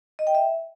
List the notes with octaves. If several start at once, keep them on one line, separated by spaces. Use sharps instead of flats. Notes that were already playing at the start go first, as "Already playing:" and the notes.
D#5
G5
E5